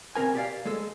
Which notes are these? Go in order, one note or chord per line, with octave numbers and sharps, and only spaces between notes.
B2 F#3 C4 A#4 G#5
G4 D5 F5
G#3 A4